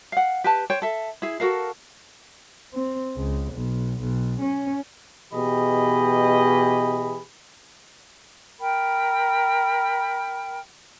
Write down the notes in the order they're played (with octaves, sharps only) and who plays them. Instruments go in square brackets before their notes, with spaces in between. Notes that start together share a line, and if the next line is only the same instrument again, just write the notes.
[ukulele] F5 F#5
G4 B4 A5
C5 C#5 G5
A4 E5
E4 G#4
F#4 A4 A#4 F5
[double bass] C4
C#2
B1
B1
C#4
[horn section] B2 E3 G4 G#4 D#5 B5
[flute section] A#4 G5 B5